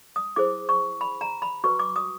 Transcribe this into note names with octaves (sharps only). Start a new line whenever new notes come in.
D#6
E4 G#4 C5 D6
C#6
B5
A#5
B5
F#4 B4 C#6
D6
D#6